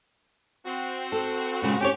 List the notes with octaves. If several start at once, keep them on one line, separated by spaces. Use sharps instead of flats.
C4 F#4
A4
A#2 C#3 G#3
C#4 G4 C#5